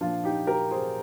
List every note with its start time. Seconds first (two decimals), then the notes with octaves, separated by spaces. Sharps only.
0.01 A#2 F3 D4 F4
0.24 D#4 G4
0.47 G4 A#4
0.71 G#4 C5